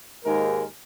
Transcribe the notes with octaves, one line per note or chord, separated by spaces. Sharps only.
D#2 G#2 G#3 A#4